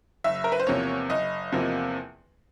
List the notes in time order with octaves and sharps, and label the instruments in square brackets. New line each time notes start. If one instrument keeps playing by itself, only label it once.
[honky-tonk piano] F#1 E5
A#4
B4
C5
E2 C3 F3 A#3 C#5
F#1 D#5
E2 C3 F3 A#3